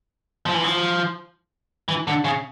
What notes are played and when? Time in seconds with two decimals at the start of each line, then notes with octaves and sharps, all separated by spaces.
0.46 F3
0.54 E3
0.64 F3
1.88 E3
2.07 D3
2.24 C#3